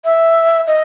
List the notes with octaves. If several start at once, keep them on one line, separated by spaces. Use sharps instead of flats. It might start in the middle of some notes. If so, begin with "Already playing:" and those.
E5
D#5